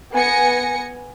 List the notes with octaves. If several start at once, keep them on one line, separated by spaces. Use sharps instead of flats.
B3 G#5 A#6 C#7